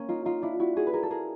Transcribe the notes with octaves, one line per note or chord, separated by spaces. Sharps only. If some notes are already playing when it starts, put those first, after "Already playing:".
Already playing: A#3 C#4
D#4 F4
D#4 F4
D4 E4
E4 F#4
F#4 G#4
B4
G#4 A#4
A4
G#4 A#4